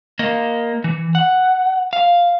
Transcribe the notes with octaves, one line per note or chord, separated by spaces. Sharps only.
A#3 D#5
E3
F#5
F5